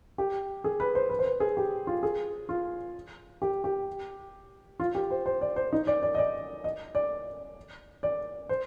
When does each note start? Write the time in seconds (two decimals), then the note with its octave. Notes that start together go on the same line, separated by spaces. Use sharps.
0.18 G4
0.64 G#4
0.80 B4
0.95 C5
1.10 B4
1.19 C5
1.25 B4
1.40 G#4
1.57 G4
1.87 F4
2.03 G#4
2.49 F4
3.42 G4
3.64 G4
4.80 F4
4.95 G4
5.11 C5
5.26 C5
5.41 D5
5.56 C5
5.73 D#4
5.87 D5
6.03 D5
6.15 D#5
6.18 D5
6.64 D#5
6.95 D5
8.03 D5
8.49 C5